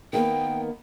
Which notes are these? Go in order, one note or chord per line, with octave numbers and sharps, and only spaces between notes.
D#3 A#3 B3 G5